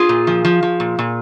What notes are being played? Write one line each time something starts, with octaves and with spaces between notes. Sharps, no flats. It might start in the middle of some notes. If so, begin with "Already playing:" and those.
Already playing: F4 G#4
A#2
F3
F3
F3
A#2
A#2